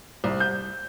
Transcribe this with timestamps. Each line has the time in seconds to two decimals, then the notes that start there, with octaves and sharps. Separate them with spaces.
0.24 C2
0.40 G6